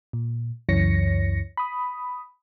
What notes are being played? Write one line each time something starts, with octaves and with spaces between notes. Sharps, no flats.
A#2
C#2 F#2 E3 C#5 A#6 C#7
B5 D#6